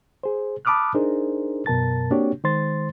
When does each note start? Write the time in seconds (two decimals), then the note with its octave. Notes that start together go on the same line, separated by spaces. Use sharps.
0.23 G#4 C5
0.65 A5 B5 D6 D#6 F6 F#6
0.94 D4 D#4 G#4 A#4 C5
1.66 F#2 B2 A#4 A5 A6
2.11 A#3 C4 D4 F#4 G4 C#5
2.44 D#3 G#3 C5 C6 A6